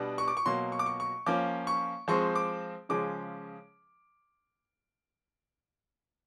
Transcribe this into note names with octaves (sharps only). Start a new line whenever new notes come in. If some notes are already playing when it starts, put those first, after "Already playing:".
Already playing: B2 G3 B3 D4
C#6
D6
C#6
B2 F#3 A#3 C6
C#6
D6
C#6
C#6
F3 A#3 C#4 D6
C#6
F3 G#3 C4 C#6
D6
C#3 F3 G#3 C#4 D6